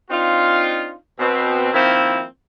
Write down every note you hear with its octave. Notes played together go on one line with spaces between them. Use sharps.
C4 D4 D#4 F4
B2 C4
D#3 F3 A#3 C4 E4